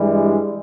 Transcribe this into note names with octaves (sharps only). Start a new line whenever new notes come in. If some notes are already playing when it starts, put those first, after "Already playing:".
Already playing: G2 E3 G3 G#3